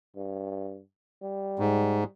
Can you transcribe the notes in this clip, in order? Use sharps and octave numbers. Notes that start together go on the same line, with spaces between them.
G2
G3
G#2